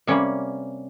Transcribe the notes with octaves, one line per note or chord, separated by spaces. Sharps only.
C3 G3 A#3 C#4